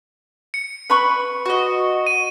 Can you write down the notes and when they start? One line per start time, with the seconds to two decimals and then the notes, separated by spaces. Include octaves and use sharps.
0.54 C#7
0.90 B4 B5 C#6
1.46 F#4 D#5
2.07 D#7